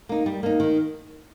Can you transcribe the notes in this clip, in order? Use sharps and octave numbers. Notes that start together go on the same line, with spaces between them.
A#3 D#4
G3
A#3 D#4
D#3